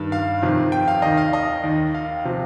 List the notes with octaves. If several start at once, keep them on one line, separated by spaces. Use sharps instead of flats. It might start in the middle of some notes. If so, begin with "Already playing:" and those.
Already playing: G2 D#3
F5
F2 C3 D#3
G5
F5
D#2 D#3 D#5
F5
D#5
D#2 D#3
F5
C3 F3